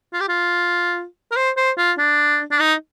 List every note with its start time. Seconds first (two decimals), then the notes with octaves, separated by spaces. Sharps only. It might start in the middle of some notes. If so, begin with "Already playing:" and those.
0.13 F4
0.20 G4
0.28 F4
1.32 A#4
1.36 C5
1.57 C5
1.78 F4
1.98 D4
2.51 D4
2.60 D#4